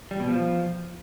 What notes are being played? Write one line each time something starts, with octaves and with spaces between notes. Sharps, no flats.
G3
B2
F3